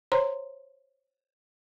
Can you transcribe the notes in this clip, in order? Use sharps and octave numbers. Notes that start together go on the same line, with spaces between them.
C5 C#5 A#5 C6